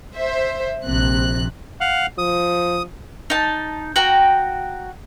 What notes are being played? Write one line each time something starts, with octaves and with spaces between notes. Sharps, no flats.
C5 E5
A#1 C3 F#6
F5 F#5
F3 D#6
D#4 A5
F#4 G5 A#5